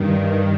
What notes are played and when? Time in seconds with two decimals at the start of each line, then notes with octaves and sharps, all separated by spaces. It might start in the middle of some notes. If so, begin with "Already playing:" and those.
Already playing: G2 D#3